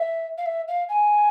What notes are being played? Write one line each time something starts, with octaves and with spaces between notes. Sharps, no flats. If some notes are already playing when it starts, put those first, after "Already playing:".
Already playing: E5
F5
E5
F5
G#5